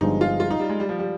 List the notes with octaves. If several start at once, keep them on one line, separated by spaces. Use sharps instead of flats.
G1 G2 F3 G#3 D#4
F4
F4
D#4
G3
G#3
G3
F3
G3